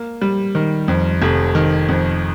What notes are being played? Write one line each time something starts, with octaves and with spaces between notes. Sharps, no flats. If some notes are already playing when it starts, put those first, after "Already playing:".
Already playing: A#3
G3
D#3
F2
F1
D#3
F2